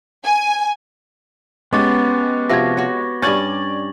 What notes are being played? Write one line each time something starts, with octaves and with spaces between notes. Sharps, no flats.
G#5
G#3 B3 C#4 G4 C#6 D6 A6
C3 F3 F#4 G#6 A#6
F#4 C#5
G2 C#4 D5 C#6 G#6 A6 F#7